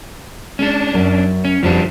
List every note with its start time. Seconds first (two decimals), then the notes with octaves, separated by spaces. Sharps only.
0.59 G#3 C#4 D4
0.94 F#2 F#3 A#4
1.45 C#4
1.63 F2 F3 G3 D4 F#4